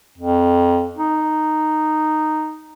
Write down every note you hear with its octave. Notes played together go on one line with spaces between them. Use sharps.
F2
D#4